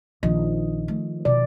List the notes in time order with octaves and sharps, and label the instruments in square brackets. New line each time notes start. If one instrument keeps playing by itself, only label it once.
[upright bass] A#1 [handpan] D#3 F3 D#5
[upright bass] A3
[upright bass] B2 [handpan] D5